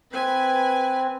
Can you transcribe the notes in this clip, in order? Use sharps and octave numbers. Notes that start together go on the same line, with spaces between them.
C4 B4 G#5